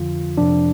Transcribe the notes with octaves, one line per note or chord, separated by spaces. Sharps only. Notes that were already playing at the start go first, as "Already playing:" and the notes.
Already playing: F2 D3 F3 F4
F2 C3 F3 D4